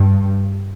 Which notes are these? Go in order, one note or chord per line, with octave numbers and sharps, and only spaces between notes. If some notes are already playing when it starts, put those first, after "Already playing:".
Already playing: G2